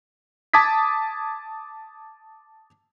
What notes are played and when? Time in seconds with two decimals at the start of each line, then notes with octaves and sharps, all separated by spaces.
0.54 A5 D6 D#6 G#6 B6